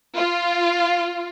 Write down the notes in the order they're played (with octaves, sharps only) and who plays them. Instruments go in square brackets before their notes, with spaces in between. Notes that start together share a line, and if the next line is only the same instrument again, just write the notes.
[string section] F4